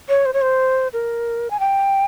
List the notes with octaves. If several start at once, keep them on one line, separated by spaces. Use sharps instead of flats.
C#5
C5
C#5
C5
A#4
G#5
G5